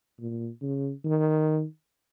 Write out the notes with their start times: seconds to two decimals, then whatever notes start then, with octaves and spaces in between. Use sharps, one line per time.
0.20 A#2
0.61 C#3
1.05 D#3